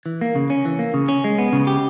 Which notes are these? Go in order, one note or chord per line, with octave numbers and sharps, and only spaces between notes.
E3
A#3
C#3
C#4
E3
A#3
C#3
C#4
G#3
B3
C#3
G4